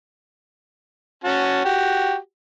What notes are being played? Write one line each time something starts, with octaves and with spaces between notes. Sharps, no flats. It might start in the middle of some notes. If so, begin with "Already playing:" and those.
C#4 F#4 A5
F#4 G4